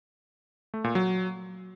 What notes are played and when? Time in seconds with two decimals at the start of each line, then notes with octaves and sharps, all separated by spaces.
0.74 A3
0.84 A#2
0.95 F#3